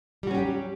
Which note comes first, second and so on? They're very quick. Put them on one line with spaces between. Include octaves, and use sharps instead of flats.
G3 F#4 C#4 G4 F#3